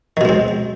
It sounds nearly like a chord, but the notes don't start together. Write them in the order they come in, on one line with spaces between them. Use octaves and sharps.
D#3 B2 G#3 C4